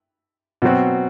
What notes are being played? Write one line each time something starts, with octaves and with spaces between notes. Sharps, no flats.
B2 F#3 C4 F#4